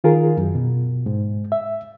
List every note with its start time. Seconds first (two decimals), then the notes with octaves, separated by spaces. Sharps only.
0.04 D#3 F4 G#4 A#4
0.37 F#2
0.55 B2
1.06 G#2
1.52 E5